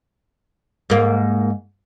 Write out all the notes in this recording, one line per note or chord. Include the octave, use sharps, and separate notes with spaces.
G#2 A#3